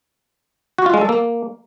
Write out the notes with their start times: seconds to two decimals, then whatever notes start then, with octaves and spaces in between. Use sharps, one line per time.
0.78 F#4
0.86 F4
0.94 G#3
1.01 A4
1.09 A#3